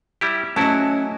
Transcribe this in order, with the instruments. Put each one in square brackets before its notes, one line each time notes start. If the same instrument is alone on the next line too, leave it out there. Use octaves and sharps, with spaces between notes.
[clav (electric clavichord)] G3 E4 G4
[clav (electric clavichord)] F#3 E4 F#4 [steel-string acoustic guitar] A3 D#5 [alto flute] C#4 [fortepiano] A5